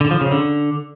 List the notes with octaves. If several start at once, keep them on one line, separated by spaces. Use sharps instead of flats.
D3
F3
C#3
D3